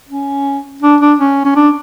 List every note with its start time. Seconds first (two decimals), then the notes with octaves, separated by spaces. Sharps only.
0.09 C#4
0.82 D4
1.01 D4
1.19 C#4
1.45 C#4
1.56 D4